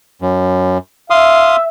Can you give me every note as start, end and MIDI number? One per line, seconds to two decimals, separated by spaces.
0.22 0.78 42
1.10 1.66 76
1.10 1.56 77
1.10 1.56 84
1.10 1.56 87